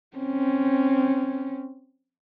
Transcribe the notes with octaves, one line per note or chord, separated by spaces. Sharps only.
C4 C#4